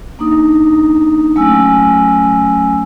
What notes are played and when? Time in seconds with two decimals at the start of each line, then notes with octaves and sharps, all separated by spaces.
0.19 A#3 D4 D#4 D#6
1.36 F#3 A3 C#4 G#5 E6